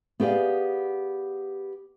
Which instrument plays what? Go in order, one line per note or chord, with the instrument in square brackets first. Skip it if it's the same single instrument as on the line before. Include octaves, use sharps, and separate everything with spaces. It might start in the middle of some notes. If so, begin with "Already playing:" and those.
[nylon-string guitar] B3 G4 G#4 D5 F5